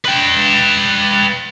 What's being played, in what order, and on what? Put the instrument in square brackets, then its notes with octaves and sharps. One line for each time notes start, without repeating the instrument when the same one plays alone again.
[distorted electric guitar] B4 G5